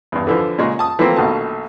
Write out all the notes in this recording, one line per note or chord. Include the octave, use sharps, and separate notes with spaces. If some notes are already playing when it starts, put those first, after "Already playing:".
E2 G2
D3 E3 F3
A#2 C#3 G#3
A5 D#6
E3 F3 A3 A#3 C4
A#1 B2 D#3 A3 A5